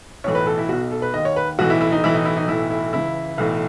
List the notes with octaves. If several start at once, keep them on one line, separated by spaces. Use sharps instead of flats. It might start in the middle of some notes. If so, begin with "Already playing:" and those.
B1 A2 E3 C#5
B4
A4
E4
B1 B2 F#4
A4
B4
D#2 D#3 D#5
C#5
B4
B1 A2 E3 F#4
E4
E4
D#4
B1 A2 E3 E4
D#4
E4
D#4
B1 A2 E3 E4
E4
C#2 C#3 E3 E4
B1 A2 E3